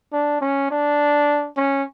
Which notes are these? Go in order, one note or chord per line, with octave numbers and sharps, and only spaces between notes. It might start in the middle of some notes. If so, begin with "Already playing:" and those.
D4
C#4
D4
C#4